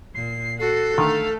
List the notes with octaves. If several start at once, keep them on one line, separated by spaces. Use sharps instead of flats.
A#2 C7
F#4 A4 C7
D3 D#3 A3 F5